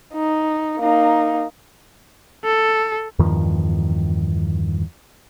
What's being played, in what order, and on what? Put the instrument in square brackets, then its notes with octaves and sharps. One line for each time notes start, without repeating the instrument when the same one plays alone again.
[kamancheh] D#4
A#3 D#4
[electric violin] A4
[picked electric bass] E2 G2 D#3 F3